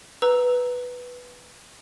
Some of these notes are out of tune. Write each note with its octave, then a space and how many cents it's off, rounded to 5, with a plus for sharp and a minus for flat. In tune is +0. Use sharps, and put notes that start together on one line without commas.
B4 +0 A#5 +0 E6 -5